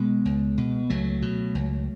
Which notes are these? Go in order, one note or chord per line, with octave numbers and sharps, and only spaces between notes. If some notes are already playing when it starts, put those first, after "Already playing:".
Already playing: B2 G#3 B3
C#2
B2
C#2 F#3 A3
B2
C#2